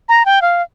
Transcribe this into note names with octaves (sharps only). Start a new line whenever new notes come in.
A#5
G5
F5